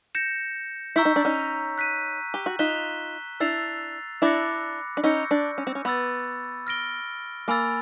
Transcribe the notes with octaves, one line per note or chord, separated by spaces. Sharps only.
G6 A#6 C#7 E7
E4 A#5 C#6 E6 G6 B6
D#4
D4
C#4 D#4
F#6 B6 D#7
G4
F#4
D#4 F4 F#6 B6 E7 G7
D4 E4 E6 A6 C7 F7
D4 E4 B5 D6 F#6 A#6 C#7
D4
C#4 D#4 C#6 E6 G6 A#6 C#7
D4
C#4
C4
C#4
B3 B5 E6 A6
F6 A#6 D7 G7
A#3 G#5 B5 E6 A6